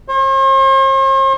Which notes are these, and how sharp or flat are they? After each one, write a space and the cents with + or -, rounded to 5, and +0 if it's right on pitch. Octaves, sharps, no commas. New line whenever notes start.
C5 +45